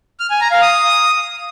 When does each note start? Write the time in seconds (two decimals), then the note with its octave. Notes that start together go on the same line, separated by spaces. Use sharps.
0.20 F6
0.30 G#5
0.41 A#5
0.51 F5
0.62 D#6